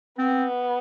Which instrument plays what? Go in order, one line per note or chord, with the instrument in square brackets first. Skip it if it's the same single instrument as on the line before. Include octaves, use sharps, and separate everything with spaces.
[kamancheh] B3 [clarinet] C4